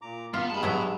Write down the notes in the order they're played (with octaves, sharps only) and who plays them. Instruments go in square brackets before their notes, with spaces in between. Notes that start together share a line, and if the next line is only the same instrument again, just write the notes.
[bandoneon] A#2 A#5 D6
[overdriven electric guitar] B3 [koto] F4 [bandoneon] E5
[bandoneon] G2 G#3 [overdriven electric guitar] A5 B5
[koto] F#3 B3 E4